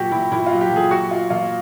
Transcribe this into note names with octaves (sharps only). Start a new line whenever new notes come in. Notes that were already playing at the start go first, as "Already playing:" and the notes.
Already playing: A#2 F#3 F#4 G4
A#2 E4
A#2 E4
F#3 F4
G4
A#2 G#4
F#3 F#4
F#3 F4
A#2 F4